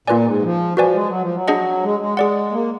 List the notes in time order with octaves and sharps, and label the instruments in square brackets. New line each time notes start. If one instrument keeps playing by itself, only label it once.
[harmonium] A#2 [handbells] A#3 F4 B4 D5 G#5
[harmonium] G#2
F3
[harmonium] F3 [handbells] F#4 B4 D5 G#5
[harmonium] G#3
F#3
F3
F#3
[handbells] D4 G#4 D#5 F#5
[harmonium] G#3
G#3
[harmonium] G#3 [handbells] G#4 D5 F#5
[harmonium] A#3